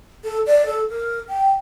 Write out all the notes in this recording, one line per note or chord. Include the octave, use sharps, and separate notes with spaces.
A4
D5
A4
A#4
G5